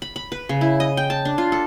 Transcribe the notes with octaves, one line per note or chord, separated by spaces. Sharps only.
B5
B5
B4
C#3
E4
D#5
G5
A5
D4
F4
A4